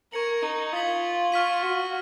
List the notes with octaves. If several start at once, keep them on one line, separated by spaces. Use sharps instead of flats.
A#4 C#6 G#6 C#7 F#7
D#4
F4 D#6 G#6 B6 F#7
F4 C#6 F6 B6 D#7
F#4